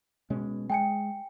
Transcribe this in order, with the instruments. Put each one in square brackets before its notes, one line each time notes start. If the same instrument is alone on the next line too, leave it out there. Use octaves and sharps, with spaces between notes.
[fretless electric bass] B2 G#3 C#4
[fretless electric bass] G#3 [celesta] G5 G#5 C#7